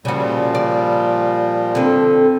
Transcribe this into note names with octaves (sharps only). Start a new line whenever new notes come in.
A#2 C#3 F3 G3 F#4
D5
D3 C4 D4